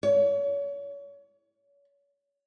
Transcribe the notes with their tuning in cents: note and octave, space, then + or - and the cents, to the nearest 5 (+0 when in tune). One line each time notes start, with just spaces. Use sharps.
C#5 +35